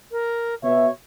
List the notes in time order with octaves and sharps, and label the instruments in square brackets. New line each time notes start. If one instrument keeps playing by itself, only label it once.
[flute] A#4
[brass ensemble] B2 E5 [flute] C#5